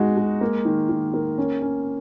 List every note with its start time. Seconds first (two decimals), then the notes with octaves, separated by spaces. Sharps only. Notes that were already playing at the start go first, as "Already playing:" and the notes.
Already playing: G#3 D#4 F#4
0.17 G#3
0.41 A#3
0.65 D#3
0.89 D#3
1.14 A#3
1.38 C#4
1.62 C#4